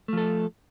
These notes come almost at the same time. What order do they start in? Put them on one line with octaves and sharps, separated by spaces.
A3 F3 A4